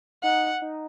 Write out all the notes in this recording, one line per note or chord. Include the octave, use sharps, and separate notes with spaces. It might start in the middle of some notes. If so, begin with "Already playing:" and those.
D#4 F#5
D#4